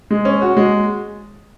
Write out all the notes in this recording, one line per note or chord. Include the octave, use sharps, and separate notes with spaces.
G#3
C#4
F#4
G#3